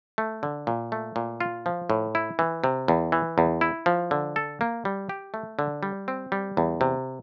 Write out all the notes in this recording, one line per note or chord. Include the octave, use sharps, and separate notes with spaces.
A3
D3
A#2
A3
A#2
F4
F3
A2
E4
E3
C3
E2
E3
E2
E4
F3
D3
A4
A#3
G3
G4
A3
D3
G3
C4
G3
E2
C3